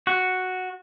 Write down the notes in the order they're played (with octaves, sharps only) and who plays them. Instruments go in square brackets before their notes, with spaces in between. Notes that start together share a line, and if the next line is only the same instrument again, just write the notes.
[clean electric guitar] F#4